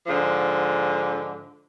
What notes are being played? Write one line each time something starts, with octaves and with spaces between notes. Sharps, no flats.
G#2 D3 F3